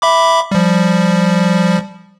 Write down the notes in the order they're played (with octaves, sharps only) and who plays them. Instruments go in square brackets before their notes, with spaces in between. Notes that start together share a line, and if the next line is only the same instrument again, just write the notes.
[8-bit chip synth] E5 B5 D6
F3 G3